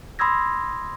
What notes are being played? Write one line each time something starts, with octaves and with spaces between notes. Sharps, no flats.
B5 C6 D#6 E6 G#6 A#6